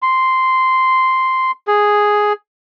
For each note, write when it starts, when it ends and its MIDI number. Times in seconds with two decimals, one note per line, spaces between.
0.02 1.51 84
1.67 2.33 68